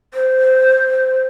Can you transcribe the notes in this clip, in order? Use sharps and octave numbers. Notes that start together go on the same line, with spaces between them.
C5